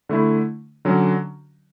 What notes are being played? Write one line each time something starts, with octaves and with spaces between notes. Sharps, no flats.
D3 A3 E4
D3 F#3 C#4